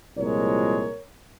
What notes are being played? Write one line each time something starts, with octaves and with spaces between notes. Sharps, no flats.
C2 A#2 F3 G#3 A#4 C#5